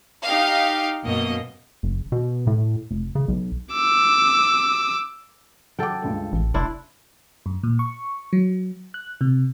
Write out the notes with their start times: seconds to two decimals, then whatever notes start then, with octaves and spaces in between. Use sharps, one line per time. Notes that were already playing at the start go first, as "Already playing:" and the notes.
0.24 D#4 G4 F5
1.03 F#2 B2 A#3 D#5
1.83 F#1
2.12 B2
2.47 A2
2.91 F1
3.15 C#3
3.28 B1
3.72 D6 E6
5.79 F#3 A4 F#5 G5 D6
6.02 C#2 G2 A3
6.33 A1
6.54 F1 D4 E4 C6
7.46 F#2
7.63 A#2
7.79 C#6
8.33 F#3
8.94 F#6
9.21 C3